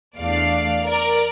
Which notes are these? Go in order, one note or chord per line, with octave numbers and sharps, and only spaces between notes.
E2 E3 A3 D4 D5 F5
A#4 D5